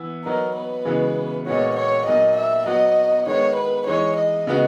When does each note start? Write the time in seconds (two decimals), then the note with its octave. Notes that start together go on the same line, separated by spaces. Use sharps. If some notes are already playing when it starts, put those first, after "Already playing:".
Already playing: E3 B3 E4
0.25 F#3 B3 D#4 A#4
0.56 B4
0.85 C#3 E3 G#3 B3 F#4
1.46 A#2 G#3 B3 D#4 F#4 C#5
1.76 C#5
2.06 A#2 F#3 A#3 D#4 D#5
2.37 E5
2.66 F#3 B3 F#4 D#5
3.27 D#3 G#3 B3 C#5
3.56 B4
3.87 E3 G#3 D#4 C#5
4.17 D#5
4.47 C#3 G#3 B3 D#4 F#4